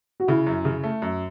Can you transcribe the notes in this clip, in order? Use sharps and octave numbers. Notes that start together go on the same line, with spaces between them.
F#4
C#3 E4
F#2
C#3
A3
F#2